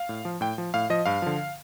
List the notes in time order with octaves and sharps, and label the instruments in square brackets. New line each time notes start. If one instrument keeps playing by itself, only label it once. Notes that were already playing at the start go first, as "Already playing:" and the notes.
Already playing: [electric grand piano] F5
A2
F3
A2 G5
F3
A2 F5
F3 D#5
G2 F5
D3 F3